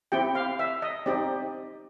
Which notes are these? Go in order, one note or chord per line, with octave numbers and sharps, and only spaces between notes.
C4 E4 G4 G5
F5
E5
D#5
C4 D#4 G4 D5